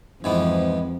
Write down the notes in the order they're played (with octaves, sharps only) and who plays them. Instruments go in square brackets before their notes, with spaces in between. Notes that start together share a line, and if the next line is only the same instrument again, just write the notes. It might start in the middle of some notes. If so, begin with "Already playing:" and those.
[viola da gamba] F2 [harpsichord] G#2 E3 B3